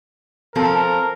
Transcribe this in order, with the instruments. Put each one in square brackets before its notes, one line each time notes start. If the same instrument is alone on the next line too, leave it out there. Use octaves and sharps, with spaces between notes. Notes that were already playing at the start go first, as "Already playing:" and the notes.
[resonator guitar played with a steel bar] F3 C4 A4 [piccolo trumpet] A#4